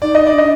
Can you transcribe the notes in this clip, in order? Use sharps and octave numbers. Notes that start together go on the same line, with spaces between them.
D#4 D5
D#5
D#4 D5
D4 D#5